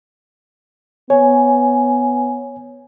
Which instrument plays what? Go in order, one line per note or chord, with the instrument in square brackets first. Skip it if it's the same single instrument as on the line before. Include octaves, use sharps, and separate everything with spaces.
[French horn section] B3 [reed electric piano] C#5 [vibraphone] G#5